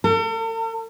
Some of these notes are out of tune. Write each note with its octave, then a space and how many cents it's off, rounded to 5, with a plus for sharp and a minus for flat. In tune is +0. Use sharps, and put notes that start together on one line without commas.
A4 +45